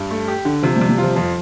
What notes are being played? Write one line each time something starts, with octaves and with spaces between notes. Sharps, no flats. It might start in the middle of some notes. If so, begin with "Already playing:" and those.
Already playing: G2
A3
G4
D3
C3 F3
G3
C3
G3
F3 F4
F2 F3